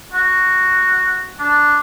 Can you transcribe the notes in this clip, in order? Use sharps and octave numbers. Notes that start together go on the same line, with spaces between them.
F#4
D4